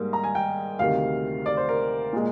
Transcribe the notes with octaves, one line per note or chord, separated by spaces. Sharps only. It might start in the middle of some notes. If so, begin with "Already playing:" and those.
Already playing: G#2 G3 A#3
A#5
G#5
G5
D2 C3 D#3 F5
D5
C5
A#4
A#2 G#3